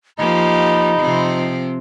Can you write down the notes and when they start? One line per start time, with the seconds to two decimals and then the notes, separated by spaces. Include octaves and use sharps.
0.19 F3 A#3 D#4 G4 B5
0.98 C3 F3 C4